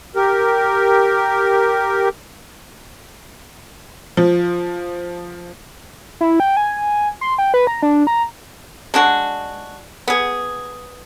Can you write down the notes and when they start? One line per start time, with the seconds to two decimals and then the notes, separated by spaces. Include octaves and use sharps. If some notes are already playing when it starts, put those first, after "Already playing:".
0.15 G4 A#4
4.17 F3
6.21 E4
6.40 G5
6.57 G#5
7.21 C6
7.38 G5
7.54 B4
7.67 A#5
7.83 D4
8.07 A#5
8.94 G#3 D4 F#4
10.07 B3 G#4